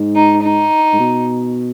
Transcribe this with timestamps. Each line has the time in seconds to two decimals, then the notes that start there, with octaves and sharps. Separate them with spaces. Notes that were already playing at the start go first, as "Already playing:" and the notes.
Already playing: G#2
0.15 D#4
0.43 D#4
0.93 G#2
1.00 B2